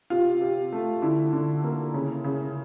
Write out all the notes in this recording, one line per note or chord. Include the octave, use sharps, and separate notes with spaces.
C3 F4
C3
A3
D3 E4
D3
A#3
C#3
C#3